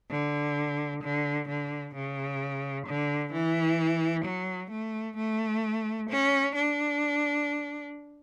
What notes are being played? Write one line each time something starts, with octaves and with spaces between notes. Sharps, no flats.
D3
D3
D3
C#3
D3
E3
F#3
A3
A3
C#4
D4